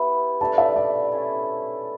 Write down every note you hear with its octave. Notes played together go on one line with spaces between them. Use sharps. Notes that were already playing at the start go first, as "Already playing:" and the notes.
Already playing: B3 E4 G4
A3 D4 G4 B4 A5
E5
D5
C#4 E4 A4